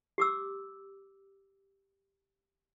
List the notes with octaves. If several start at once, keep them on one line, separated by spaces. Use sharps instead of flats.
G4 D6 E6